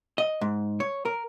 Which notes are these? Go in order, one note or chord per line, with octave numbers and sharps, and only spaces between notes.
D#5
G#2
C#5
A#4